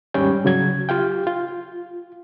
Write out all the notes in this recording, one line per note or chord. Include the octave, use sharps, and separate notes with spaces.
D#2 G#2 G3 C#4 G5
C#3 F#3 G#6
F4 G4 F5 G5
F4